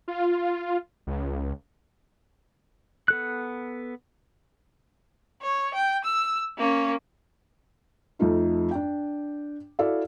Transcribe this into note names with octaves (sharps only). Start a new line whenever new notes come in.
F4
C#2
B3 A4 F#6
C#5
G5
E6
A#3 C#4
F2 F3 A3 D#4 F4
D4 G5
E4 F#4 A4 D5 E5 F5